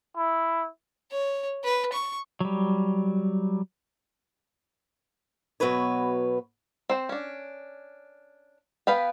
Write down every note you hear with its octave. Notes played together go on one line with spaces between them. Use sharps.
E4
C#5
B4
C#6
F#3 G3
B2 D#3 F#3 B3 B4 C#5
C4 C5
C#4 D4
B3 B4 F5 G5